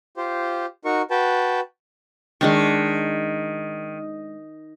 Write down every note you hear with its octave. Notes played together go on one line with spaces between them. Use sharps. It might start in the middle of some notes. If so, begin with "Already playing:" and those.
F4 G4 C5
D#4 F#4 A#4 C#6
F#4 B4 G5 A5
D#3 G#3 D4 C#6